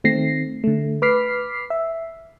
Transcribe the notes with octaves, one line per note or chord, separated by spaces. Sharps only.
D#3 A3 C4 A#6 C7
D3 A3
B4 D6 F6 B6 C7
E5